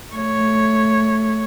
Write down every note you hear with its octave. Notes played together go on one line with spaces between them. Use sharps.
A3 C#5